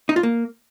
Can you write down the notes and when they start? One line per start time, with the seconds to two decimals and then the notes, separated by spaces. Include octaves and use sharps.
0.09 D#4
0.16 F4
0.23 A#3